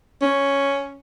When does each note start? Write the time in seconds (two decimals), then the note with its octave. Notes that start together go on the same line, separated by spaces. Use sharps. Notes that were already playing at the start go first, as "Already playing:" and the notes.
0.22 C#4